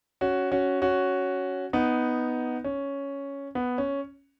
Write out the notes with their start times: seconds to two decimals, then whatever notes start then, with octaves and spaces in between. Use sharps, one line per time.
0.21 C#4 F#4
0.52 C#4 F#4
0.82 C#4 F#4
1.73 B3 D#4
2.64 C#4
3.55 B3
3.78 C#4